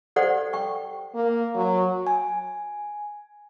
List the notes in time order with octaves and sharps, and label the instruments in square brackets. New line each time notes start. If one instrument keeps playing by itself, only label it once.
[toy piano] G4 A4 C5 D5 F#5
G5 C#6
[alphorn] A#3
F#3
[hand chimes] G#5